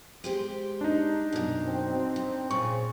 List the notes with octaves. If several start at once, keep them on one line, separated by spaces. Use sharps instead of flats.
G#3 G4 C5
D4 D#4
F#2 B2
C4
F2
A#2 C#3 C4 C#6